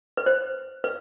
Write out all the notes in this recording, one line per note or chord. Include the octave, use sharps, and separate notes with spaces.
B4
C5
B4